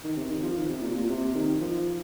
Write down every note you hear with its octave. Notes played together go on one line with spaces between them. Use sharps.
D#3
C3
D#3
F3
D#3
C3
A#2
A#2
C3
D#3
F3